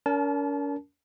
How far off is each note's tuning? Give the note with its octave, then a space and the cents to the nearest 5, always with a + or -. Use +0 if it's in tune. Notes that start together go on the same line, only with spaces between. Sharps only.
C#4 +45 A#4 +0 A5 -30